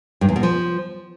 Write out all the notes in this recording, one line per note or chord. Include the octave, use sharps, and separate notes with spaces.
G2
E2
B2
F3